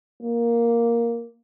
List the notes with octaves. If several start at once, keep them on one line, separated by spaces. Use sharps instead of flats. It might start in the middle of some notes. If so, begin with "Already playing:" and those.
A#3